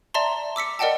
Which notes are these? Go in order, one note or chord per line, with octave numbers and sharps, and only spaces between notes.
D5 E5 A5 A#5 C6
D6 E6 B6 C#7
A#4 D5 D#5 F#5 G5 A5